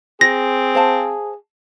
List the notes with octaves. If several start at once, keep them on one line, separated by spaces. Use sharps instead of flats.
C4 G#4 A#6
C5 F5 A5